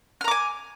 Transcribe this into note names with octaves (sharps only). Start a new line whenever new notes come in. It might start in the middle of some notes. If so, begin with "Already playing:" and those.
G#5 A#5 D6 F6